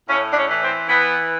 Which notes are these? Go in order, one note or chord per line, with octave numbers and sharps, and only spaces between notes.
A2 C#4
D4
C#4
E3
C4
E3 B3